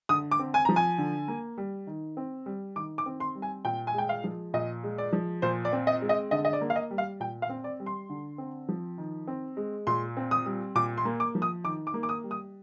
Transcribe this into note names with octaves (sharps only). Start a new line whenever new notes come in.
D3 D#6
D6
C4
G#5
F3 A#5
G#5
D3
A#3
G3
D#3
C4
G3
D#3 D6
D6
C4
C6
G3
G#5
A#2 G5
G#5
G#3 G5
F5
F3
A#2 D#5
G#3
D5
F3
A#2 C5
D5
C4
D#5
G#3
D#5
D3 D#5
D#5
D5
A#3
F5
D#5
G3
F5
A#2 G5
F5
C4
D5
G3
C6
D3
C4
F3
D#3
C4
G#3
A#2 C6
C4
D#6
G3
A#2 D6
C6
A#3
D6
F3
D#6
D#3 D6
D6
A#3
D6
D#6
G3
D#6